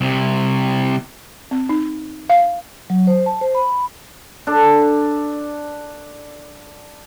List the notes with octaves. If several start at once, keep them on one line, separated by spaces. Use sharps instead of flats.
C2 C3
C4
D#4
F5
F#3
C5
A5
C5
B5
D4 A4